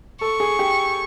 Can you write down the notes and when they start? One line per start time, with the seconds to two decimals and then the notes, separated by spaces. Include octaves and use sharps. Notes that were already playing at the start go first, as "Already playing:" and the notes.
0.21 A4 C#6
0.40 G#4
0.59 G4